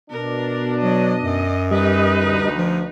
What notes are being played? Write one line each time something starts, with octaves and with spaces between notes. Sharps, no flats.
B2 D4 A#4
F#3 D#5
F#2
G3 D#4 B4 D#5
D2
F3